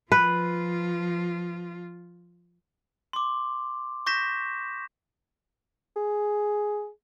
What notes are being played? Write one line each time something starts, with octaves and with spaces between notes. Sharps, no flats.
F3 F4 B4
C6 D6
C#6 G6 A#6 B6 E7
G#4